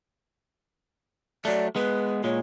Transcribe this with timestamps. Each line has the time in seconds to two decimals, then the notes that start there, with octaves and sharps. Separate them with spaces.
1.45 F#3 A3 D5
1.76 G#3 B3 B4
2.24 A#2 G#3 C#5